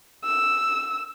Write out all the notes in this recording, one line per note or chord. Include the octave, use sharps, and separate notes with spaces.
E6